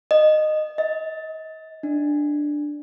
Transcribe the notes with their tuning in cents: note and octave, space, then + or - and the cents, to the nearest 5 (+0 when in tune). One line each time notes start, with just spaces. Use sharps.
D#5 -15
D#5 +35
D4 +5